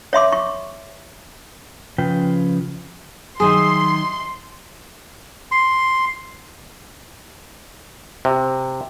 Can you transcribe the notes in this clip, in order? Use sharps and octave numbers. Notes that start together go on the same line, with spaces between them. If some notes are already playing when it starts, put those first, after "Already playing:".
C#5 E5 C6 D6
C#6
C#3 F3 F4 B4 G5
D#3 F#3 G#4 C5 E5 C6
C6
C3